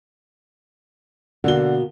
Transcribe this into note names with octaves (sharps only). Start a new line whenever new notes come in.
B2 D3 A#3 F#4 G7